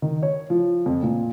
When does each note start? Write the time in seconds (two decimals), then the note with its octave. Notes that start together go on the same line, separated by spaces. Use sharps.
0.02 D#3
0.23 C#5
0.50 F3
0.86 F2
1.03 A#2